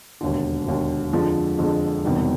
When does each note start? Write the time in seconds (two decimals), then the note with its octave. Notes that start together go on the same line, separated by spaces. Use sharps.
0.21 E1 D#2 D3
0.66 E1 D#2 D3
1.13 F2 D3 F3 G#3
1.59 F2 D3 F3 G#3
2.04 E1 E2 C3 D#3 G3